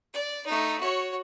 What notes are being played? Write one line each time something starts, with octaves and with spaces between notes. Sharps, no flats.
D5
A3 D#4
F#4 C#5